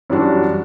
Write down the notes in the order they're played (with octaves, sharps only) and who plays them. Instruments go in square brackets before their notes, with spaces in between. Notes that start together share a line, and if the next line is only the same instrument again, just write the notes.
[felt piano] F#2 E3 G3 D4 F#4